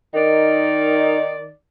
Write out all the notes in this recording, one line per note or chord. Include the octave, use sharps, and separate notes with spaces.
D#3 D#4 A#4 D5